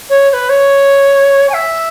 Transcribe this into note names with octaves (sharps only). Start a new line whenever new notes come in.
C#5
C#5
B4
C#5
G#5
E5